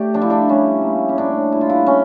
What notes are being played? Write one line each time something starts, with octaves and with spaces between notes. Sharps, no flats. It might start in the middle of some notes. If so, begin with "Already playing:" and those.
Already playing: A3 G4 D5
F3 D4
E4
D4
G3 C#4
A#3
C#4
A2 D4
G3 E4
F4
E4
C#4